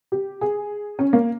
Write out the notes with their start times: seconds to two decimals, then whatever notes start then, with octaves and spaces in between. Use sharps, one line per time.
0.12 G4
0.41 G#4
0.99 C#4
1.13 A#3